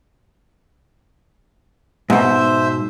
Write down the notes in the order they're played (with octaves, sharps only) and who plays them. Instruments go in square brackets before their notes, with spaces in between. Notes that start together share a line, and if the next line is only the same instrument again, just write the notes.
[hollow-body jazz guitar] G#2 B2 [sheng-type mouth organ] C5 E5